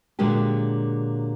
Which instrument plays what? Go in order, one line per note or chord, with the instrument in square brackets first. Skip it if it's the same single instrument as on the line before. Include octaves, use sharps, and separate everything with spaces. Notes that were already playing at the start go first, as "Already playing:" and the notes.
[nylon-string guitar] A#2 D3 F#3 G#3 A#3 G4